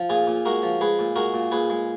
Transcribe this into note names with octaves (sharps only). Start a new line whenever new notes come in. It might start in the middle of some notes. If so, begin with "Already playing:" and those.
Already playing: F3
A#2 F4 G#4
A#2
G#3 F#4 A#4
F3
G#3 G#4 B4
A#2
G#3 F#4 A#4
A#2
A#2 G#4 B4
G#3